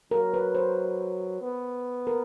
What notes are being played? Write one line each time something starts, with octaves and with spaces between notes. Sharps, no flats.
F#3 A#4
B4
C5
B3
A#4